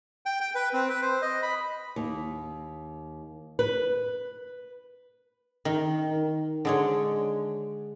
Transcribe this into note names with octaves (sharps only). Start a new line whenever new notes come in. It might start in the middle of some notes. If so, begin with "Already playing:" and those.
G5
G5
B4
C4
B4
C5
D#5
B5
D#2
B4
D#3
D3 G#3 C#5